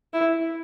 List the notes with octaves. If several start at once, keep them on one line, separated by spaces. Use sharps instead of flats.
E4